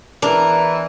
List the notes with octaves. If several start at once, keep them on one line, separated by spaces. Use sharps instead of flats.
E2 E3 D4 A#4